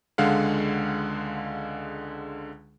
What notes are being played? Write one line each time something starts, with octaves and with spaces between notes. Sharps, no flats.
C#2 D3 G#3 F5 F#5